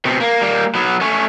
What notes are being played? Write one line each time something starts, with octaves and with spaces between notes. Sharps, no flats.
B2 C4
A#3
G3 A#3
F#3 B3
A3 C#4